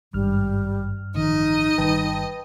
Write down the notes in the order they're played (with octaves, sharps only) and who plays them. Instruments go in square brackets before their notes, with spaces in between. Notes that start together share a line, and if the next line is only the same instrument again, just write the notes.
[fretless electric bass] G#1 [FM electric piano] G2 F6 [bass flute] G3
[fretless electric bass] A1 D#3 F3 [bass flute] D#4 [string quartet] D#5
[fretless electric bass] G1 D#3 G3 [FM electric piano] B4 G5 A5